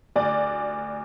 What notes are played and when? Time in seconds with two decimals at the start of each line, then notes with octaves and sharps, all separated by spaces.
0.16 D2 D5